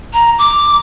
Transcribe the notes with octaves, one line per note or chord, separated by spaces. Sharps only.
A#5
D6